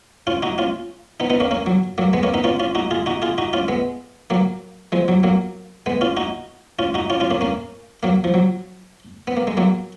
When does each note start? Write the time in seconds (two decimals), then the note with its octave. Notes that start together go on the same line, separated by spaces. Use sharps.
0.27 C#4 F4
0.43 D#4 F#4
0.58 C#4 F4
1.20 B3 D#4
1.30 B3 D#4
1.40 A#3 C#4
1.51 A#3 C#4
1.66 F#3
1.98 F#3 A#3
2.13 G#3 B3
2.23 A#3 C#4
2.34 B3 D#4
2.44 C#4 F4
2.60 C#4 F4
2.75 D#4 F#4
2.91 F4 G#4
3.06 D#4 F#4
3.22 F4 G#4
3.38 D#4 F#4
3.53 C#4 F4
3.68 G#3 B3
4.30 F#3 A#3
4.92 F3 G#3
5.08 F#3
5.23 F#3 A#3
5.86 G#3 B3
6.01 C#4 F4
6.17 D#4 F#4
6.79 C#4 F4
6.94 D#4 F#4
7.10 C#4 F4
7.20 C#4 F4
7.31 A#3 C#4
7.41 A#3 C#4
8.03 F#3 A#3
8.24 F3
8.34 F#3
9.27 B3
9.37 A#3
9.47 G#3
9.57 F#3 A#3